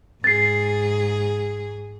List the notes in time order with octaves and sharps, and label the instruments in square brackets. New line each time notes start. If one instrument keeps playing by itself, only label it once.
[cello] G#2 G#4 [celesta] A6 C7